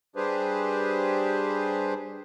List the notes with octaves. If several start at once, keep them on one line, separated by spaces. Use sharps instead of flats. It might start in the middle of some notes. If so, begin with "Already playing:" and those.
G3 D4 G4 G#4 B4 C5